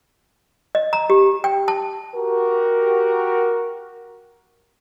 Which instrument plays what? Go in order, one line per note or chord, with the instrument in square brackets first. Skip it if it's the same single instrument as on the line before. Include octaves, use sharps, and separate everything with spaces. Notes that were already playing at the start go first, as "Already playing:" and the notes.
[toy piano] D#5
A#5
G4
G5
A5
[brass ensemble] F#4 G4 A#4